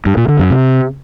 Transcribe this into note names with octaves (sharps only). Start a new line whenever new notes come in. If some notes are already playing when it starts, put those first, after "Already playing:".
G2
A#2
D3
F#2
C3